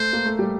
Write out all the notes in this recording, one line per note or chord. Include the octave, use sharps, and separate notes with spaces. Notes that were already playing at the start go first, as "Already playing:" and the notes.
Already playing: A3 C5
A#3
A3
G3